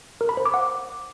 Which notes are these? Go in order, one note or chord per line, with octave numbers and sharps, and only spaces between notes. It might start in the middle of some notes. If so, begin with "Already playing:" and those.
A#4
B5
C5
D6
F#5